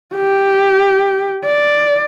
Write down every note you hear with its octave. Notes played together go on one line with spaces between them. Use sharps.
G4
D5